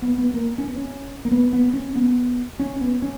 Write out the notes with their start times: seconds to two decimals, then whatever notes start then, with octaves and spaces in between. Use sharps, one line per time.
0.02 B3
0.18 B3
0.34 A#3
0.58 C#4
0.67 B3
0.75 C#4
1.25 A#3
1.31 B3
1.53 B3
1.74 C#4
1.96 B3
2.59 C#4
2.81 B3
3.02 C#4